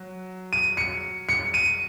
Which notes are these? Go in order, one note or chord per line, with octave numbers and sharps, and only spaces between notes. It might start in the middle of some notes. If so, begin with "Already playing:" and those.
Already playing: F#3
D#7
C#7
C#7
D#7